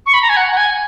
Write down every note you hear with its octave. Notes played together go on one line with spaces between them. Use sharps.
C#6
B5
A#5
G#5
F#5
F#5
G#5